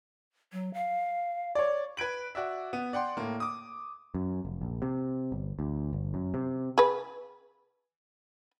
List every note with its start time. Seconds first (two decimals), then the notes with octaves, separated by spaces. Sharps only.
0.53 F#3
0.74 F5
1.55 C#5 D5
1.97 B4 G#6 D7 F#7
2.35 F#4 D5 E5
2.73 B3
2.93 D5 F#5 G5 C6
3.17 A2 A#3
3.40 D6 D#6
4.15 F#2
4.45 F1
4.61 A#1
4.82 C3
5.32 G1
5.59 D2
5.93 G1
6.14 F#2
6.34 C3
6.78 G#4 B4